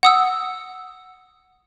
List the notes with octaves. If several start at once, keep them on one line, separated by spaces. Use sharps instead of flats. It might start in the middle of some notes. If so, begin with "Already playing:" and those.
F#5 D#6 E6